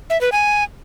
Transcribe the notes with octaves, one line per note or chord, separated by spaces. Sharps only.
E5
B4
G#5